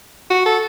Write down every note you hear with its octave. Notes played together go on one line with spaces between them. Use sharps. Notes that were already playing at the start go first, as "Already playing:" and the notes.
F#4
A4